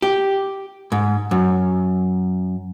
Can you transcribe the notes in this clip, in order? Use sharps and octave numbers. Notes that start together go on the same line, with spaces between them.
G4
G#2
F#2